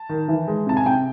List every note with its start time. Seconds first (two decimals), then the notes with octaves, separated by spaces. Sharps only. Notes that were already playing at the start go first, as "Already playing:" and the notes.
Already playing: A5
0.09 D#3
0.28 E3
0.48 G#3
0.67 C3 A5
0.77 G#5
0.86 C3 G5